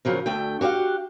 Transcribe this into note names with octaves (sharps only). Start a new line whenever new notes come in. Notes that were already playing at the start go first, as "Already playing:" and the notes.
C#3 F3 F#3 A#4
D2 A3 G5
F#4 G4 C#5 F5 F#5